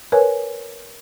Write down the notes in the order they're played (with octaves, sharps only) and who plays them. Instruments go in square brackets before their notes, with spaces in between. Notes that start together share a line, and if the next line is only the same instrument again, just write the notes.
[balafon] A#4 B4 C#5 G#5